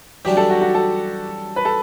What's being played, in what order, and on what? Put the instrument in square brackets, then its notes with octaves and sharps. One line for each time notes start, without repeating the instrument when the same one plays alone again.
[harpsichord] F#2 E3 G3 D4 [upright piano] G4
[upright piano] A4
F#4
F#4
A4
B4
A4